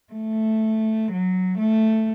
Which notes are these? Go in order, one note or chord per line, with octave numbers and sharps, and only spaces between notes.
A3
F#3
A3